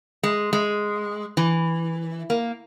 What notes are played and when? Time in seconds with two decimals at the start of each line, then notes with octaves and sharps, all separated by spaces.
0.23 G#3
0.53 G#3
1.37 E3
2.30 A#3